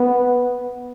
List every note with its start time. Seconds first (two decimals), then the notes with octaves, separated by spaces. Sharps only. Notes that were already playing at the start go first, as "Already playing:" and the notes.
Already playing: B3